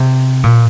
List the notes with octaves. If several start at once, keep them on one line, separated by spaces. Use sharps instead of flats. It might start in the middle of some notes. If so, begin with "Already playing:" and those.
Already playing: C3
A#2